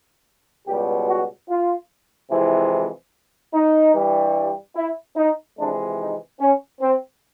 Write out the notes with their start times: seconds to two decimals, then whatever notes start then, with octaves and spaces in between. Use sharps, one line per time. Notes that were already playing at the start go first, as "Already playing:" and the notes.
0.67 C#2 B2 G3 G4
1.08 F#4
1.49 F4
2.31 F2 C3 E3 G#3 E4
3.54 D#4
3.94 G2 E3 G3
4.76 E4
5.17 D#4
5.58 F2 C3 E3 G#3 D4
5.99 D#4
6.40 C#4
6.81 C4